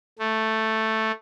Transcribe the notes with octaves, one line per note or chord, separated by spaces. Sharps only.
A3